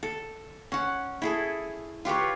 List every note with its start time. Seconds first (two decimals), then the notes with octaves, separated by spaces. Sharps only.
0.03 A4
0.72 C#4 F#5
1.22 E4 G#4 A4
2.05 F4 G4 B4 C#5